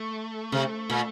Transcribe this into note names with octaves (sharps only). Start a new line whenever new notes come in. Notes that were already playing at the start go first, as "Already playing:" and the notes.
Already playing: A3
C3
A#2